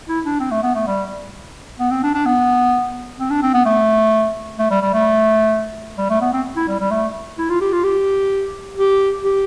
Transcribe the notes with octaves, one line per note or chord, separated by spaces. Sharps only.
E4
D4
C4
A3
B3
A3
G3
B3
C4
D4
D4
B3
C4
D4
C4
B3
A3
A3
G3
G3
A3
G3
A3
B3
C4
E4
G3
G3
A3
E4
F4
G4
F4
G4
G4
G4